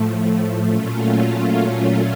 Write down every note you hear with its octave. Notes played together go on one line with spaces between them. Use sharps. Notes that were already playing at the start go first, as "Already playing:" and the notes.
Already playing: A2 F3 A3
A#2 F#3 A3 C#4 F4